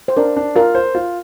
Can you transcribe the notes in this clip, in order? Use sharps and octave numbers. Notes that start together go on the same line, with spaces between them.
C5
D4 A#4
D4
F4 A#4
C5
F4